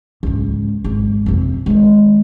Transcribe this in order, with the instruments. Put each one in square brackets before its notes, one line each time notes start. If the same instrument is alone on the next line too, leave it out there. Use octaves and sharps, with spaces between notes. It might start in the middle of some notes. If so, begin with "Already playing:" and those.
[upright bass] C#2 G#2
G#1
F2 C3
D#3 G#3